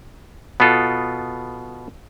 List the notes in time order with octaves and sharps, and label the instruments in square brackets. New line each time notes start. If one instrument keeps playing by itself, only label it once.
[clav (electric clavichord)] B2 B3 F4 A4